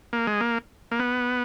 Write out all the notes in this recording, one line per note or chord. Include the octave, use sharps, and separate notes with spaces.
A#3
G#3
A#3
A#3
B3